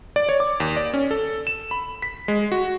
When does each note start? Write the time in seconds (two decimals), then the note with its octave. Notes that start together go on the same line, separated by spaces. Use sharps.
0.16 D5
0.29 C#5
0.40 D6
0.60 D#2
0.77 D5
0.94 C#4
1.11 A4
1.47 E7
1.71 B5
2.02 B6
2.28 G#3
2.52 F#4